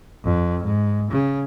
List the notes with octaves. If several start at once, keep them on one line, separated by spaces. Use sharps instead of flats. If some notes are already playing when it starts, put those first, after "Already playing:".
F2
G#2
C#3